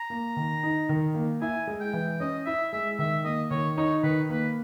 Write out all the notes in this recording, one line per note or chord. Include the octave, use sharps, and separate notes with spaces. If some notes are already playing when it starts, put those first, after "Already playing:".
Already playing: A#5
A#3
D#3
D#4
D#3
A#3
E4 G#5
G#3
G5
E3
C#4 D#5
E4 E5
G#3 E5
D#3 E5
A#3 D#5
D#3 C#5
D#4 C#5
D#3 B4
A#3 B4